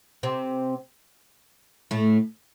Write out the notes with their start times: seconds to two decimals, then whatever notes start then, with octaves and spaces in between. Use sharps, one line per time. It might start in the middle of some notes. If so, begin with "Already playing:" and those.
0.23 C3 C4
1.91 A2 A3